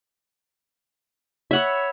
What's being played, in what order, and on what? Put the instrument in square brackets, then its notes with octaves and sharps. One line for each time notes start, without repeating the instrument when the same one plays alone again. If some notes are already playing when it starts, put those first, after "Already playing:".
[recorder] C#5 [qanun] E5 F#5 B5